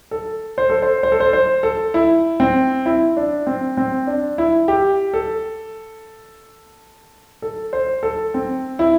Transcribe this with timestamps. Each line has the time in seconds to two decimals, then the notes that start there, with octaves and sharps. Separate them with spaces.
0.11 A4
0.58 C5
0.70 A4
0.82 C5
1.03 C5
1.12 A4
1.20 C5
1.33 C5
1.63 A4
1.94 E4
2.40 C4
2.86 E4
3.17 D4
3.47 C4
3.77 C4
4.07 D4
4.38 E4
4.68 G4
5.14 A4
7.42 A4
7.73 C5
8.03 A4
8.34 C4
8.79 E4